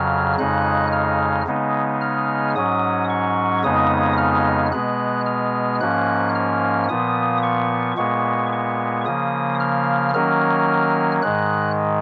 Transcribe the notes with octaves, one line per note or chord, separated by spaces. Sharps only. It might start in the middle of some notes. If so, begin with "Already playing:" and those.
Already playing: F2 C#3 F#3 F6
F2 C#3 G#3 D#4 F#6
F6
C#3 G#3 B3 D#4
F6
G#2 F#3 C#4 D#6
C#6
F2 C#3 G#3 B3 D#4 D#6
F6
B2 G#3 B3 F#6
F6
G#2 F3 A#3 C#4 F#6
F6
A#2 F3 B3 D#6
C#6
A#2 G#3 B3 C#6
C#6
C#3 F3 A#3 D#6
F6
D#3 F#3 A#3 C#4 F6
G#2 D#3 G#3 F#6